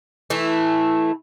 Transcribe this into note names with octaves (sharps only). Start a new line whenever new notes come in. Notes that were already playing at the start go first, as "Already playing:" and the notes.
E3 A3 E4